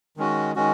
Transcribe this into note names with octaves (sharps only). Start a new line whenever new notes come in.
D#3 G#3 C#4 F#4
D#3 G#3 C#4 F#4